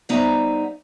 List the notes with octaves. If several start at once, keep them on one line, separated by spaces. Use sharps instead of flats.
G3 B3 D#4 C5 E5 A#5